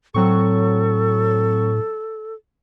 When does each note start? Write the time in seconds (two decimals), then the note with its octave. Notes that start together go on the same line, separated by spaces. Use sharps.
0.14 A2 F#3 C4 A4 C#6